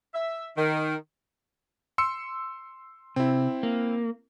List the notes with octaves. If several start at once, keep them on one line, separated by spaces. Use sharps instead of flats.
E5
D#3
C6 E6 C#7
C3 C4 E4
A#3